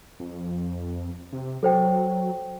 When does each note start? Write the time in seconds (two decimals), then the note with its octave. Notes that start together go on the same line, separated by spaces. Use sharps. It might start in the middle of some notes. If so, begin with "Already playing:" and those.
0.20 F2
1.33 C3
1.63 F#3 A4 C5 G5